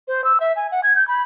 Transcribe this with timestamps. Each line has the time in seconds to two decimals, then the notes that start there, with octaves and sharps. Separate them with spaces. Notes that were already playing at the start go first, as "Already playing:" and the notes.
0.08 C5
0.24 E6
0.40 E5
0.56 G#5
0.72 F#5
0.83 G#6
0.96 G6
1.08 B5